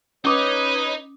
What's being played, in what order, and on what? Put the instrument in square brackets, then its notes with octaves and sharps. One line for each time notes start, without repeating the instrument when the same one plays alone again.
[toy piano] C#4 D6 D#6 [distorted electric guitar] D#4 D#5 [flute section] B4 C#5